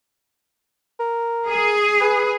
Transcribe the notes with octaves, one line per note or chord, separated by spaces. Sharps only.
A#4
G#4
B4